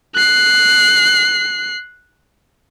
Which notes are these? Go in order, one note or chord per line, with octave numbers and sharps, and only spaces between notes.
F#6 C7